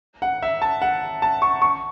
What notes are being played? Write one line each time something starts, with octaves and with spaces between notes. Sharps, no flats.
F#5
E5
A5
F#5
A5
C#6
C#6